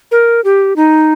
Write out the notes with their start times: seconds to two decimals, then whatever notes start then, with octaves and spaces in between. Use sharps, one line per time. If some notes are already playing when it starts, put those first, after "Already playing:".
0.11 A#4
0.44 G4
0.76 D#4